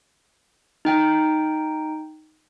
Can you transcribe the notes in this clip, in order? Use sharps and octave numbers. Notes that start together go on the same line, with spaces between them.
D#4 G5